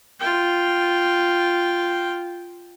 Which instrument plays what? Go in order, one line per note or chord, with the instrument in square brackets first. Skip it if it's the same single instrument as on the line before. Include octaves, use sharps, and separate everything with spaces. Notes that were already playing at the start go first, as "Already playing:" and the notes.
[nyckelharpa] F4 G5